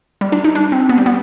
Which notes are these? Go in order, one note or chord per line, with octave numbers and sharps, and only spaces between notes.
G3
D4
D#4
D4
C4
B3
G3
B3